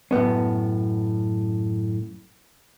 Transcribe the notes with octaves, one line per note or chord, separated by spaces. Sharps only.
F#2 A2 B3 C#4